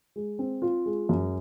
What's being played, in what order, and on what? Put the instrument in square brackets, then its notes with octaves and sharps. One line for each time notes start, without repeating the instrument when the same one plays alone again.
[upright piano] G#3
C4
F4
G#3
F#2